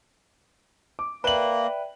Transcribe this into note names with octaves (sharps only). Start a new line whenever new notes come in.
D6
A#3 B4 D5 E5 G5 F#7